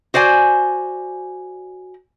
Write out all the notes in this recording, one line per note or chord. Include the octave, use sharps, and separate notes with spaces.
F#4 C5 D5 G#5